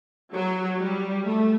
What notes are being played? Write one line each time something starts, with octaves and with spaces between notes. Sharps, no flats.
F#3
G3
A3